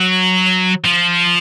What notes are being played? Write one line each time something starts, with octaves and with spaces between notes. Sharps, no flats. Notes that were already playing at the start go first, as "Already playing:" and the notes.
Already playing: F#3
F3